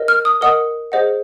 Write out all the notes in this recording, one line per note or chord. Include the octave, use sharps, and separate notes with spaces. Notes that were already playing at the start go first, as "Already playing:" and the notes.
Already playing: A#4 D#5
F6
D#6
A#4 D#5 F#5 D#6
G#4 C5 D#5 F#5